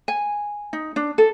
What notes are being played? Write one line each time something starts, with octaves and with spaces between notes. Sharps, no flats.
G#5
D#4
D4
A4